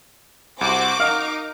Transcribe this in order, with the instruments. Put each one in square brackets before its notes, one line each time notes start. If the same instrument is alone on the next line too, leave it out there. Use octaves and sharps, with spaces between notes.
[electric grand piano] C2 [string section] C4 F#4 C5 [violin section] D6
[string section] D#4 A#4 [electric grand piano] D#5 F5 [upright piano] F6